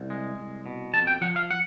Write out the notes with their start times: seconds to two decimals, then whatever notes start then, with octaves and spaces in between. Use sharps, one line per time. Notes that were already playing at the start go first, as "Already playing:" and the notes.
Already playing: C2
0.10 G#3
0.38 C2
0.66 B2
0.94 F2 A5
1.07 G5
1.21 F3 F#5
1.36 F5
1.51 F#5